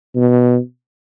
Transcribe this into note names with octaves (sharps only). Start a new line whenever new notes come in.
B2